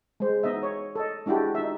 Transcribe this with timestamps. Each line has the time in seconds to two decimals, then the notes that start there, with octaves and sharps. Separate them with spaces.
0.20 G#3 C5
0.43 B3 D#4 D#5 E5
0.63 C#5
0.95 A4 D#5
1.26 G#3 D4 E4 F#4 G4
1.55 D#4 E5